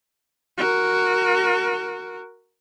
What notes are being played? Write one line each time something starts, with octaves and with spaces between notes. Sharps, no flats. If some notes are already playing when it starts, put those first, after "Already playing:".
F#4 A#4